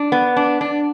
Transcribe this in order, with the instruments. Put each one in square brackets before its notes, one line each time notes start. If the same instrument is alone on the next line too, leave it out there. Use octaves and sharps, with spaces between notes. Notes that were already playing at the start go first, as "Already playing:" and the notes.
Already playing: [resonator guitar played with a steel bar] D4
B3
D4
D4